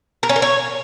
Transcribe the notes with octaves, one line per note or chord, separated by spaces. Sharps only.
A#4
C#4
A#4
C#5